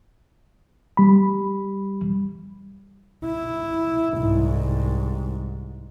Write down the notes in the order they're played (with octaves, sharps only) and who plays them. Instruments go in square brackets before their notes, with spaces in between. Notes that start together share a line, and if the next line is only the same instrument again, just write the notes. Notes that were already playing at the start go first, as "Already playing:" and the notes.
[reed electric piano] G3 B5
[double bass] E4
C2 G#2